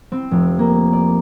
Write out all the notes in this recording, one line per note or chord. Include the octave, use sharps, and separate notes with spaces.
C4
F1
A#3
D5